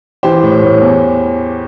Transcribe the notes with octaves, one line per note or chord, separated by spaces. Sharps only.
E3 G4 C5
A2
A2
E2